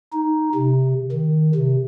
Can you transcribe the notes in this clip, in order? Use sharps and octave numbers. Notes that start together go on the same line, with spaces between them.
D#4
C3
D#3
C3